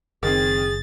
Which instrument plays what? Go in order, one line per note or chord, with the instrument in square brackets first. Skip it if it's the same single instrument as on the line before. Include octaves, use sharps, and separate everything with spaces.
[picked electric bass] F#1 [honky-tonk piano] D#3 C4 [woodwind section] G#4 [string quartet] A6